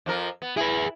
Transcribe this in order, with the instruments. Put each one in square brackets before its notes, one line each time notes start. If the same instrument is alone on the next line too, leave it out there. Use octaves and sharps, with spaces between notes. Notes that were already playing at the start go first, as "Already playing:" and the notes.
[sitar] F2 F3 A#4
B3
[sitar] E4 [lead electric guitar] G#4 B4